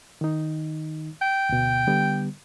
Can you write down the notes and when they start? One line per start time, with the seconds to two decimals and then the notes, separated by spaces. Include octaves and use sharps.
0.21 D#3 D#4
1.22 G5
1.49 D2 B2
1.87 D3 G3 B3